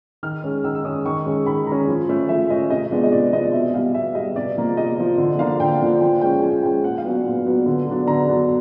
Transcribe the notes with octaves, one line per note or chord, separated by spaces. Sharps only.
D#3 F6
G#3 C#4
D#3 E6
E6
G#3 C#4 D#6
D#3 C#6
G#3 C#4
D#3 B5
G#3 C#4 A#5
F3
A3 C#4
F3 E5
A3 C#4 D#5
C3 D#5
F3 G#3 B3 D4
D#5
C3 D5
F3 G#3 B3 D4 D#5
B2 E5
G3 B3 F5
B2 E5
G3 B3 D#5
C3 D5
F3 A#3
C3 D#5
F3 A#3
D3
F3 A#3 D4 F5
D3 G5
F3 A#3 D4
F3 G5
G#3 C#4 G5
F3 G#5
G#3 C#4 G5
A#2 F#5
F5
F#3 B3 D4
A#2
F#3 B3 D4
D3
F#3 B3 D4
D3 A#5
F#3 B3 D4